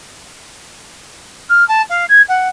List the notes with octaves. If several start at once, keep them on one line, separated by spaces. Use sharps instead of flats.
F6
A5
F5
G#6
F#5